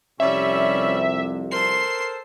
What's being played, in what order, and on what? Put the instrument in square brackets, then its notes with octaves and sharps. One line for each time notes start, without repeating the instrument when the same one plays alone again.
[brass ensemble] C2 F2 C3 [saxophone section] G3 C#4 [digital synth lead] E5
[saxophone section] A4 A#4 C5 [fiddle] C6 [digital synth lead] C7